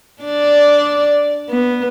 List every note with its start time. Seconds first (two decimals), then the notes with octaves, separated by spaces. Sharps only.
0.22 D4 D5
1.49 B3